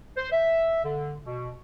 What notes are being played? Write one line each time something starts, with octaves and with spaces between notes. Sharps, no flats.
C5
E5
D3
B2